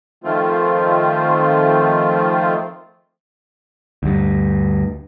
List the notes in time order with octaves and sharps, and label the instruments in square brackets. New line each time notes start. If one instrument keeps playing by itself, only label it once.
[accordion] D#3 F3 A3 C4 F4
[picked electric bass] D2 G2